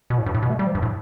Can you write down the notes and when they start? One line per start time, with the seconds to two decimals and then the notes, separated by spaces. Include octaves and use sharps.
0.10 B2
0.18 A2
0.26 G2
0.34 A2
0.42 B2
0.50 A3
0.59 G3
0.67 F3
0.75 G2
0.82 A2